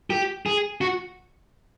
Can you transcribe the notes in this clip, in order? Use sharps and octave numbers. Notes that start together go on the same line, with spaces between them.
G4
G#4
F#4